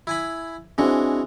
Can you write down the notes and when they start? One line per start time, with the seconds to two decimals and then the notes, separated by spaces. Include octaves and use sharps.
0.07 E4 G#5 B5
0.78 E3 G#3 C4 D4 F#4